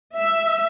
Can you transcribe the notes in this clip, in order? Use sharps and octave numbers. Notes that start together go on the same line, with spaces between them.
E5